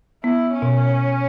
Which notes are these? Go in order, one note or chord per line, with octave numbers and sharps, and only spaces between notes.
B3 E4
C#4
B2